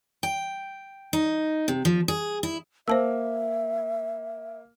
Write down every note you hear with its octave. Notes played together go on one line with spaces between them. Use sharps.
G5
D#4
C3
F3
G#4
E4
A#3 C5 E5 A5 E6